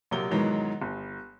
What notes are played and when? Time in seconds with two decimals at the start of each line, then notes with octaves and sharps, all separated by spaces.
0.11 A#1 C3 F#3 A#3 A#4 G7
0.31 G#2 B2 D#3 E3 F#3 G#3
0.82 G1